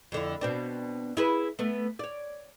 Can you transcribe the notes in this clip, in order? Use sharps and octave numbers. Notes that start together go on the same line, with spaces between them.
F2 D3 E4
B2 C4 D4
E4 G#4 B4
A3 B3
C#5 D5